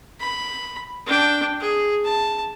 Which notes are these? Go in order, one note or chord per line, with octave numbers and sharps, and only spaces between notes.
B5
D4 G5
G#4
A5